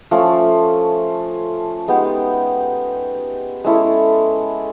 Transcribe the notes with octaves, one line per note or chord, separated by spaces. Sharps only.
F3 A3 C#4
G#3 B3 D#4 G4
G#3 C#4 E4 A4